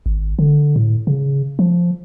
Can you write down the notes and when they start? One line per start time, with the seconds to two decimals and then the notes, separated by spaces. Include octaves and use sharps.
0.06 G#1
0.39 D3
0.76 A2
1.07 C#3
1.59 F3